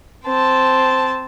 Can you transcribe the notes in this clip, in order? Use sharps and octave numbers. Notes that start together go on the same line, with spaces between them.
C4 A5